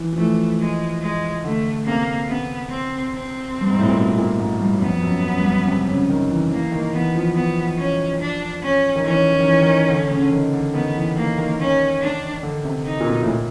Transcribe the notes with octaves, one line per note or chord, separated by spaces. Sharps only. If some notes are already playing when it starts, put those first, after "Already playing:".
Already playing: E3
F3
E3 A3
G#3
G#3
D3 A3
C3 A#3
C3 B3
C4
C4
G2
G#2
A2
A#2
B2
A#2
G#2
G2
F#2
F2 B3
F#2
F#2
G2
F#2
C3
C#3
D#3
E3
E3 A#3
D#3
E3 B3
F3
B3
C#4
D4
C#4
D#3
E3 C#4
E3
D#3
E3
D#3
D3
C#3
D3
D#3
D3
D#3 B3
E3
D#3 A#3
D#3
C#4
D4
D3
C3
D#4
A#2
B2
A2
A#2